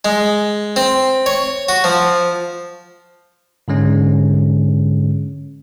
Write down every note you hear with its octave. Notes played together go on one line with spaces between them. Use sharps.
G#3
C4
C#5
F#4
F3
G#2 D3 G#3 C#4